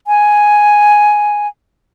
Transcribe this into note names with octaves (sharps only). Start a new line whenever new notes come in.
G#5